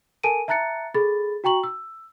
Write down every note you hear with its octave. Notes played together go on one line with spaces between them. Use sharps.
A4 A#4 G#5 A5 D7 D#7
E5 A5 A#5 F#6 A6 C#7
G#4 A4 B5 A6
F#4 G5 A#5 C#6 F#7
E6